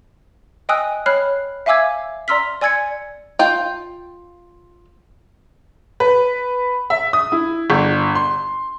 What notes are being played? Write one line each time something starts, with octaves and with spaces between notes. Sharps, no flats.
D#5 G5 G#5 D#6 E6 F#6
C#5 B5 F6 F#6 C7
E5 F5 G#5 D6 E6 G#6
D5 A#5 C6 E6 F6 B6
D5 G#5 E6 G#6 A6 C#7
F4 G5
B4
E5
D#6
E4
G1
C6